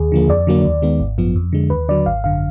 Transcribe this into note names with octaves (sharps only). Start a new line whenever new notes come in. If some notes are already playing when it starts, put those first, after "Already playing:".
Already playing: D#2 G#4
D3 F3 A#3
F2 D5
D3 F#3 A#3
D#2
D#3 G#3 B3
G#1
F#2 F3 B3
F2
D3 G#3
D#2 B4
D3 F#3 D5
G#1 F5
F#2 D3 F5